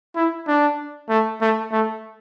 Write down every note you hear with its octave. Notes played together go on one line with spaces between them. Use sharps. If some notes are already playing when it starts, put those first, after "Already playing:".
E4
D4
A3
A3
A3